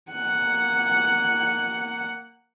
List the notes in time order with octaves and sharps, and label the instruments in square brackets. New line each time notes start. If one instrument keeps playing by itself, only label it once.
[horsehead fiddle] A#3 F#5